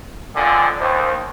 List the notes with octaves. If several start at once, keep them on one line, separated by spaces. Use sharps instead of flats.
F2 A#2 D3 G#5
D#2 C5